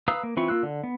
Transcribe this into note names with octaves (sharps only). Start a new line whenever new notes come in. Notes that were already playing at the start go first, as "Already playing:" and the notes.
B4 F5 A#5 D#6 E6
A#3
E3 C4 F4 B5 C#6
A#3 F4 E6 F#6
D3
B3